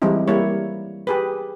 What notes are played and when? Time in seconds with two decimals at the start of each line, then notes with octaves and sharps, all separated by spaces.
0.02 E3 G3 G#3 C4 D#4 E4
0.28 G3 A#3 E4 C#5
1.07 G4 G#4 B4